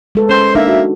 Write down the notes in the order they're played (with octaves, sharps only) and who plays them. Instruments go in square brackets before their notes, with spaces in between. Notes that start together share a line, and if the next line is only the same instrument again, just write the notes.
[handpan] G#3 A4 B4
[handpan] C#4 [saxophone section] C5
[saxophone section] A#3 E5 [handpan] D4 D#4 F4
[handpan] F#4